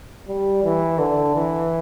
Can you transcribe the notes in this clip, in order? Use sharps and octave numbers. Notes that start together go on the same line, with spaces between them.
G3
E3
D3
E3